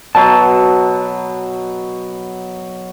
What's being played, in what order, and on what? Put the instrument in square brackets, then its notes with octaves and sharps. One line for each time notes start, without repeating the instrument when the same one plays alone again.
[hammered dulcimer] B2 F#3 [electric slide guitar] A5